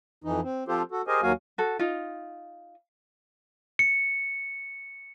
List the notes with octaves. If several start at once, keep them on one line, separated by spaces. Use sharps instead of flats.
F2 E3 D#4
C4
F3 C4 F4 G4 A4 C5
F#4 A4
G4 G#4 A#4 C5 D#5 G#5
D#2 F#3 A#3 F#4 F5 G#5
F#4 A4
D#4 F4
C#7